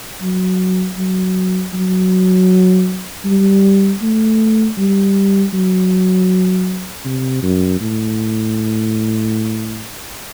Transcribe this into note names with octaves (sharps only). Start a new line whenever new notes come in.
F#3
F#3
F#3
G3
A3
G3
F#3
C3
F#2
A2